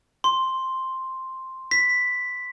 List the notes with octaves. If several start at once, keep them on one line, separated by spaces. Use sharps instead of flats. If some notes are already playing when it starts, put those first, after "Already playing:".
C6
B6